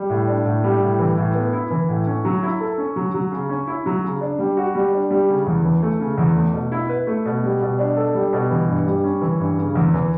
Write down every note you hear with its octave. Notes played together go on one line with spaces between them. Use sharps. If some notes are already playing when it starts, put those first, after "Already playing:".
Already playing: G3
A2
D4
A2
G3
A2
E3
A2
B3
E4
E3
A2
C#4
F#3
E4
A4
C#4
F#3
F#3
C#3
C#4
E4
F#3
C#3
D4
G3
F#4
G3
D4
G3
C#3
E2
E3
A3
C#3
E2
A3
B2
E4
B4
A3
B2
G3
B2
D4
A4
G3
B2
E3
G2
G3
C#4
E3
G2
C#3
E2
E3